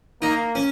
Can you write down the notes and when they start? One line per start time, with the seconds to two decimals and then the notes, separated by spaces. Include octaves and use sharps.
0.22 A#3 D#4
0.55 C#4